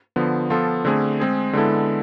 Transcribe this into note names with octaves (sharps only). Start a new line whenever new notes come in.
D3 F3 B3
F3 B3 F4 A4
D3 A3 C4 G#4
G#3 C4 G#4
D3 G#3 B3 E4 A4